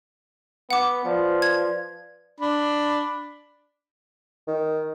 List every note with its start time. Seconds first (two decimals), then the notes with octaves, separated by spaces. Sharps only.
0.71 B3 F#5 D6
1.05 F3 B4 D5
1.42 G#6
2.40 D4 B5
4.47 D#3